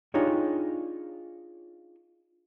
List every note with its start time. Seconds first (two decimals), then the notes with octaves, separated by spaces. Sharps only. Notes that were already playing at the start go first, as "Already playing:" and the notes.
0.14 D4 D#4 F4 G4 G#4 C#5